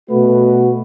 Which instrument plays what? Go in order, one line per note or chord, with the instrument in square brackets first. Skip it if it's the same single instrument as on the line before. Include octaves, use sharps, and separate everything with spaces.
[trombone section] B2 A3 F#4 B4